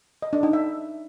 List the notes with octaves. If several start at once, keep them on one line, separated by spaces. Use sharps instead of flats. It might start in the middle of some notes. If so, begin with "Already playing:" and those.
D#5
D4
D#4
E5